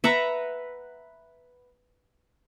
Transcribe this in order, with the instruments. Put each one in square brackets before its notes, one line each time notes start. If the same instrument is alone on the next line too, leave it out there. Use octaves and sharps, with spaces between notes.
[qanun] B4 E5 F#5 A#5